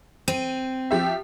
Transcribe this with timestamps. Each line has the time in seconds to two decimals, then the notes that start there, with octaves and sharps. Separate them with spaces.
0.28 C4 D#7
0.91 F3 G4 E5